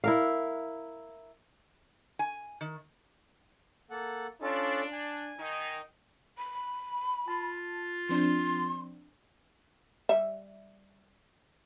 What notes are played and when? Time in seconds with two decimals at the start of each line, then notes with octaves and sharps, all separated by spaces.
0.04 E4 A#4 F5
2.19 G#5
2.61 D#3
3.90 A#3 A4 F#5
4.42 C#4 D4 F4 A4
4.92 G#5
5.38 D#3 D#4
6.38 B5
7.28 F4 A5
8.09 F3 C4 D4 C6
10.09 G3 E5